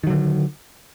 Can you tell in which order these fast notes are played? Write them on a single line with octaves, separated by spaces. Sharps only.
D#3 F#3 D3